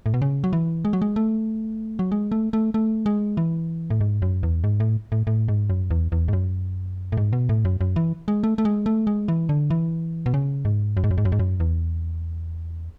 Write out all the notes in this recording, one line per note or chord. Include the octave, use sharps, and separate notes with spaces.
A2
B2
C#3
F#3
E3
G#3
F#3
G#3
A3
F#3
G#3
A3
A3
A3
G#3
E3
A2
G#2
F#2
E2
G#2
A2
A2
A2
G#2
F#2
E2
E2
G#2
F#2
A2
G#2
B2
A2
F#2
F#2
E3
G#3
A3
A3
G#3
A3
G#3
E3
D3
E3
B2
C#3
G#2
F#2
G#2
F#2
G#2
F#2
G#2
F#2
E2